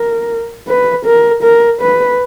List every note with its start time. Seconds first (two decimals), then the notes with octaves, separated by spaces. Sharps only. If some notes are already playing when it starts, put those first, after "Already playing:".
Already playing: A#4
0.68 B4
1.06 A#4
1.43 A#4
1.81 B4